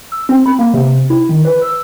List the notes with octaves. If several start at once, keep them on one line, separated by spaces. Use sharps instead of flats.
E6
C4
B5
A#3
C3
E4
D#3
B4
E6